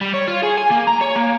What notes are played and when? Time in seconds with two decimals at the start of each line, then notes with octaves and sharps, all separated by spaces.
0.01 G3
0.14 C#5
0.28 F4
0.43 G#4
0.57 G#5
0.71 A#3
0.88 A#5
1.02 C#5
1.16 A#3